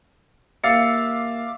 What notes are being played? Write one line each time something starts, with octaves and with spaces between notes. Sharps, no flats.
D#2 E5 F5 D6 A6 C#7